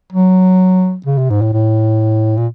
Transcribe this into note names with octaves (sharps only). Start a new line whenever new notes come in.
F#3
C#3
C3
G#2
A2
A2
A#2